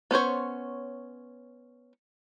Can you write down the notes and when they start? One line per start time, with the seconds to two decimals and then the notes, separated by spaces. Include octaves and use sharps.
0.11 B3 C#4 C5 C#5